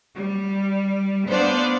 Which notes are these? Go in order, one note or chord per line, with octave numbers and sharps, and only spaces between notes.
G3
B3 D4 C5 D5 F5